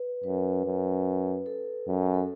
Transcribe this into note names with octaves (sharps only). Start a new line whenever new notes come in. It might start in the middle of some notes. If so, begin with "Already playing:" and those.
Already playing: B4
F#2 B4
F#2
A4
F#2
A4